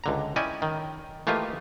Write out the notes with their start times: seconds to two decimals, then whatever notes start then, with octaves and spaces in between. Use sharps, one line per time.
0.04 C#2 D3 A#5
0.36 C#4 E4 D5 D#5 G5 G#5
0.62 D#3
1.27 E3 A3 A#3 F4 G4 D#5